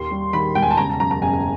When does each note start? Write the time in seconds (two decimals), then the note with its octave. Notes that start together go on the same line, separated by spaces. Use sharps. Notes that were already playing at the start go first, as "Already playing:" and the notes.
Already playing: D#2 C6
0.11 G3
0.33 D#3 B5
0.55 E1 G5
0.62 G#5
0.71 A5
0.77 C#3 A#5
0.89 A5
1.00 F#2 A#5
1.11 A#5
1.22 F#1 G#5